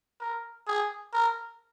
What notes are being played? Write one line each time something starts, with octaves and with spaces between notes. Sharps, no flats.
A#4
G#4
A#4